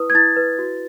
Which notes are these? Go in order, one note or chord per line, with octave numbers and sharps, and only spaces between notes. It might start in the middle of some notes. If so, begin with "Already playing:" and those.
Already playing: E4 B4 D#6
G#6
E4 A6
B4
F#4